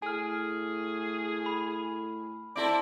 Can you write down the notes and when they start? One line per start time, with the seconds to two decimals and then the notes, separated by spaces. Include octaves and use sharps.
0.02 A2 G#4 G#5 F6
1.46 B5
2.56 C4 E4 A4 D5